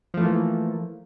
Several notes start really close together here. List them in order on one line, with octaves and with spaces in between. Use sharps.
F3 A3 E3 A#3